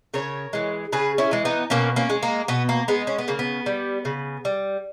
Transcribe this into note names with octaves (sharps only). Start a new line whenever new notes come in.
C#3 A#4 C#5
E3 G#3
C#3 G#4 B4
C#4 E4
E3 G#3
B3 D#4
B2 A#3 C#4
A#3 C#4
G#3
A#3
B2 B3
A#3
G#3 B3
C#4
B3
C#3 A#3
B3
G3
C#3
G3